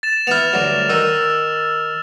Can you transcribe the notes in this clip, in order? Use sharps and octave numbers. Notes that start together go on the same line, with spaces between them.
A6 E7
B3 E4 F6 F7
D2 G2 F#3
D#3 D#4 E6